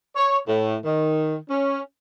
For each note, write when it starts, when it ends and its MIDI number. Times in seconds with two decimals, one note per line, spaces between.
0.16 0.37 73
0.48 0.76 45
0.85 1.36 51
1.50 1.81 61